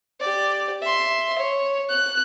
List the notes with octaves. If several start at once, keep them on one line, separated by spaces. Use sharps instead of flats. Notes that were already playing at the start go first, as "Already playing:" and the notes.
G4 D5
E5 C6
C#5
F#6